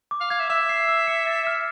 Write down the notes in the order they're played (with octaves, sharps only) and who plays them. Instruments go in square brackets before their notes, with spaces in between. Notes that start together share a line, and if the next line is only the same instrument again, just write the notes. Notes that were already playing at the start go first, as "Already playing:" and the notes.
[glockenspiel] D6
[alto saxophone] F5
[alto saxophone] F5 [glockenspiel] G#6
[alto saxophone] E5
[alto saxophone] E5 [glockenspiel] E6
[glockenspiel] C7
E6
C#7
A6
F6